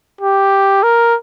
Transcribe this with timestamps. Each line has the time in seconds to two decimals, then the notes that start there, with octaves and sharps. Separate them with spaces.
0.21 G4
0.83 A#4